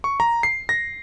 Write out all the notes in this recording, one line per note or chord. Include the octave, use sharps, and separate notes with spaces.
C#6
A#5
C7
A#6